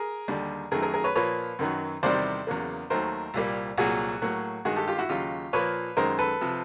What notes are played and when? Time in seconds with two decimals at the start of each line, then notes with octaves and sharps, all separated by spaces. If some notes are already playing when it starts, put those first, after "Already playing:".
Already playing: G#4 A#4
0.28 D#2 D3 G3
0.71 F#2 D#3 F#3 A3 G#4 A#4
0.82 G#4 A#4
0.93 G#4 A#4
1.04 B4 C#5
1.15 A#2 F3 A#3 B4 C#5
1.59 F#2 D#3 F#3
2.03 E2 C3 D#3 G3 C5 D5
2.47 E2 C#3 F#3 A#3
2.90 D#2 D#3 F#3 A3 A#4 C5
3.34 C2 A#2 G3 A#3
3.78 C2 A#2 F#3 F#4 G#4
4.22 A2 F#3 A#3
4.65 G2 D#3 G#3 F#4 G#4
4.76 G4 A4
4.88 F4 G4
4.98 E4 F#4
5.09 D#2 C#3 F#3 F4 G4
5.53 A#2 F3 A#3 B4 C#5
5.97 F#2 D#3 G#3 A#4 C5
6.19 A4 B4
6.41 C3 F3